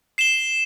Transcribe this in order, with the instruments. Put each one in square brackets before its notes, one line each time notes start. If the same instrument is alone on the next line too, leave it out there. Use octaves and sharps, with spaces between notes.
[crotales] C7 E7 G7